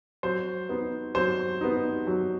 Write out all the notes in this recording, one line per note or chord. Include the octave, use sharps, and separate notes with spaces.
F#3 C5
B3 D#4
F#3 C5
B3 D#4
F#3